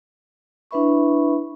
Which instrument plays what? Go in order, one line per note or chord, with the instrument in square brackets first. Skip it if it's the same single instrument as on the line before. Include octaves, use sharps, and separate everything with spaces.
[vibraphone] D4 E4 B4 E5 B5 C#6